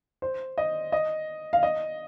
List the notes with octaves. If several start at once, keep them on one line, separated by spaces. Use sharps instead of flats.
C5
D#5
D#5
F5
D#5